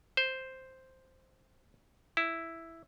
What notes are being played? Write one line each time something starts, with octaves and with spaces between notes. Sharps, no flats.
C5
E4